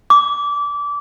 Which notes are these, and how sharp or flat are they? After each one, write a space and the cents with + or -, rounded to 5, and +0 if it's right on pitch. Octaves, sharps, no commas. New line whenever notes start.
D6 -25